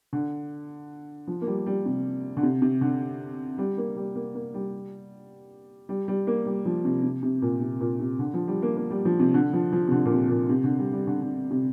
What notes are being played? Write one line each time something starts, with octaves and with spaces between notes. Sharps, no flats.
D3
F3
A#3
G3
G3
C3
D3
C3
C3
D3
G3
A#3
G3
A#3
A#3
G3
G3
G3
A#3
G3
F3
C3
C3
C3
A#2
C3
A#2
C3
D3
F3
G3
A#3
A#3
G3
F3
C3
D3
F3
F3
C3
D3
A#2
C3
A#2
C3
D3
G3
G3
D3
D3
C3